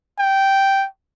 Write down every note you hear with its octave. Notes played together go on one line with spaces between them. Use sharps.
G5